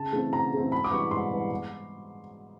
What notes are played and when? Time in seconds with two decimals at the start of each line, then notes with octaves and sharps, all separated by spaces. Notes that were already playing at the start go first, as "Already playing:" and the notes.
Already playing: C#3 A5
0.13 E3 A3 C4
0.33 C#3 A#5
0.52 E3 A3 C4
0.72 G#2 B5
0.84 D6
0.92 E3 G3 B3 C#6
1.11 G#2 C6
1.31 E3 G3 B3
1.51 G#2